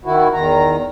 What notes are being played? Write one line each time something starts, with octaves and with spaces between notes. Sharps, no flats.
D#3 E4 F#4
E2 D#3 A#5